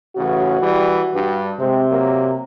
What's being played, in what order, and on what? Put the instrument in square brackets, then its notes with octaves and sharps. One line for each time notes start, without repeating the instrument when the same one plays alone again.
[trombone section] A1 C#3 E3 [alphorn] F#4
[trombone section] E3 G3
G2
[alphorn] C3 [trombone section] G#3 C4
[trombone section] F#3 A#3